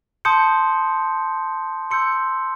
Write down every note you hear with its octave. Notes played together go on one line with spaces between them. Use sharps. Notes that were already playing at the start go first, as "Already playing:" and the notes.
A5 C6 D#6 G6 C#7
C6 E6 G6 C#7